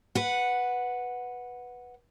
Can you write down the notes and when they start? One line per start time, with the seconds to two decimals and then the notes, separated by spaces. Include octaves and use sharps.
0.15 B4 F#5